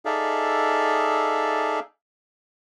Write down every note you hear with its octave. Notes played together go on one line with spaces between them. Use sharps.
D#4 G#4 A4 D5 E5 F5